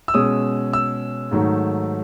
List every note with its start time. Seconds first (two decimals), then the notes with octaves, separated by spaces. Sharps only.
0.08 E6
0.14 B2 G#3 C#4 D#6
0.73 E6
1.31 G#2 D#3 F#3 A3